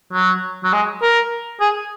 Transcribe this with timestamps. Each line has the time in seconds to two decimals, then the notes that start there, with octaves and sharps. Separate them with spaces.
0.13 F#3
0.64 F#3
0.73 G#3
1.02 A#4
1.60 G#4